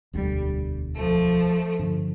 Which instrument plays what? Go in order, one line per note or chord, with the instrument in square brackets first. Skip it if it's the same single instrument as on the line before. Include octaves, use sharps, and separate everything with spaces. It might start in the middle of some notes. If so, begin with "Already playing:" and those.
[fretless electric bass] E1 D2 D3 [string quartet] G3
[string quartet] F3 A3
[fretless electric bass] G2 D3 F3